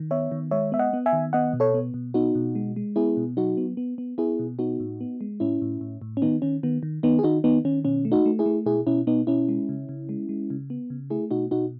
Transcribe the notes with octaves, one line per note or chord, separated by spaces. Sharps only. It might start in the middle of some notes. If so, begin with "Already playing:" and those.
Already playing: D#3
B3 C#5 E5
D#3
G#3 C#5 E5
B3 E5
D#5 F#5
B3
E5 G#5
D#3
B3 D#5 F#5
B2
A4 C#5
B3
B2
B3 D#4 F#4
B2
G#3
G#3
B3 E4 G#4
B2
F#3 D#4 F#4
B3
B3
B3
B3 E4 G#4
B2
B3 D#4 F#4
A2
B3
G#3
A2 C#4 E4
A2
A2
A2
C#4
D#3 B3 D#4
D#3 C#4
D#3 B3
D#3
D#3 B3 D#4
G#4
D#3 D#4 F#4
D#3 B3 D#4
D#3 C#4
B2 C#4
A3
D#4 F#4
A3
E4 G#4
A3
B2 E4 G#4
B2 C#4 E4
B2 B3 D#4
B2 C#4 E4
G#3
C#3
C#3
G#3
G#3
C#3
B3
C#3
A3 E4 G#4
B2 D#4 F#4
B2 D#4 F#4